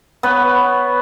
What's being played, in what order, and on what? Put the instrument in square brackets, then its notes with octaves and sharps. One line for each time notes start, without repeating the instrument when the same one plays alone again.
[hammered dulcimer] B3 B4 C#5